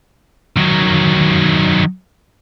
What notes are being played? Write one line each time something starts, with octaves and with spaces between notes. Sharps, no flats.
D#3 F#3